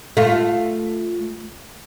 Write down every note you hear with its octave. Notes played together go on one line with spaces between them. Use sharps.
A3 F4